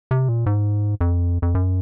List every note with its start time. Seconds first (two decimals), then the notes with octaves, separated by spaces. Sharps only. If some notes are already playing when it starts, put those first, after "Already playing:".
0.11 C3
0.29 A#2
0.46 G#2
1.01 F2
1.42 F2
1.55 F#2